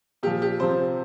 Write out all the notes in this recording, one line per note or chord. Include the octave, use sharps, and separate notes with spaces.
A#2 F3 G4
G4
C3 F3 C5